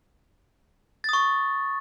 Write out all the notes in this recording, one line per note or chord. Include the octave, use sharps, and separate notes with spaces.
C#6 D#6 A6